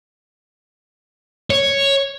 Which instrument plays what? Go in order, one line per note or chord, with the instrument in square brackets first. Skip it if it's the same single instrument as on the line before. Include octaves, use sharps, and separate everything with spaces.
[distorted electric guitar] C#5